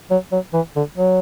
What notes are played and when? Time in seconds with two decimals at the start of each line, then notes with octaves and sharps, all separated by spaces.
0.11 F#3
0.32 F#3
0.54 E3
0.76 D3
0.98 F#3